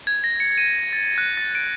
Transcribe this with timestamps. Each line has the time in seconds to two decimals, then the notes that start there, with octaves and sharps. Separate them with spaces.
0.07 G#6
0.24 A#6
0.40 C#7
0.58 D#7
0.93 A6
1.18 F#6
1.37 A6
1.55 D7